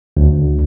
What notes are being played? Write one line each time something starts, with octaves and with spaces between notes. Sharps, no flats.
D2